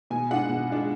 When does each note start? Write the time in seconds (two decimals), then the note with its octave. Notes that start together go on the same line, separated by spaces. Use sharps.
0.10 B2 G#5
0.30 G#3 D4 F4 F#5
0.49 B2
0.70 G#3 D4 F4